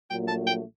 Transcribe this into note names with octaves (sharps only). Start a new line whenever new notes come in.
A#1 A#2 F#3 A3 G5
A5
G5